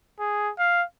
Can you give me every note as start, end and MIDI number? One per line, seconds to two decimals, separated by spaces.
0.20 0.50 68
0.59 0.83 77